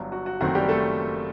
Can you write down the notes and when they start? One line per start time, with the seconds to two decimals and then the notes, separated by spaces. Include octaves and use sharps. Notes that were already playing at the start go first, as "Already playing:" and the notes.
Already playing: G1 G2 F#3
0.12 F#4
0.26 F#4
0.41 F#1 F#2 D#3 A3 C4 F#4
0.55 G3 G4
0.69 A3 A4